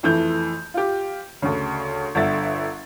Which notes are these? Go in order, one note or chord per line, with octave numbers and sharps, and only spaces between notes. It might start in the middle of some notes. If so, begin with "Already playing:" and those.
F2 E3 A3 G6
F4 G4
D2 C#3
G1 D3 E5 A6